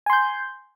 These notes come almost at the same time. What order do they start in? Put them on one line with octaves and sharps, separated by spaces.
G#5 C6 G6